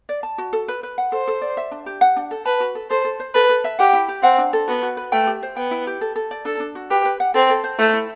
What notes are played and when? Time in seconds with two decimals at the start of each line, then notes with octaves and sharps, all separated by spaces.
0.09 D5
0.23 A5
0.38 F#4
0.53 A4
0.68 B4
0.83 B4
0.98 F#5
1.12 A4 C5
1.28 A4
1.42 D5
1.57 E5
1.71 D4
1.86 G4
2.01 F#5
2.16 D4
2.31 A4
2.46 B4 A5
2.60 F#4
2.75 A4
2.90 A4 C5
3.05 A4
3.20 C5
3.34 A4 B4
3.49 A4
3.64 E5
3.79 G4 F#5
3.93 E4
4.08 G4
4.23 C4 F#5
4.38 D4
4.53 A4
4.68 B3 F#4
4.83 F#4
4.97 B4
5.12 A3 G5
5.27 G4
5.43 C5
5.57 B3 G5
5.71 E4
5.87 G4
6.01 A4
6.16 A4
6.31 D5
6.45 D4 A4
6.60 D4
6.75 F#4
6.90 G4 B4
7.05 B4
7.20 F#5
7.34 C4 A4
7.50 A4
7.64 C5
7.79 A3 E4
7.93 E4